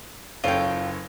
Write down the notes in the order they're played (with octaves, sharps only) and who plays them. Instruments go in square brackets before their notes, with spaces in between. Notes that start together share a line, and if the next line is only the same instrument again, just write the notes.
[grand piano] F#1 C#4 A4 [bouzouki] F4 G5